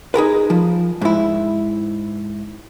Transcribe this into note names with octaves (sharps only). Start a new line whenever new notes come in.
D#4 G#4 A#4 B4
F3
G#2 E4